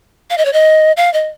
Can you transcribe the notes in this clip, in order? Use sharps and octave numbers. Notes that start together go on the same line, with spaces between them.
F5
D#5
C#5
D#5
F5
D#5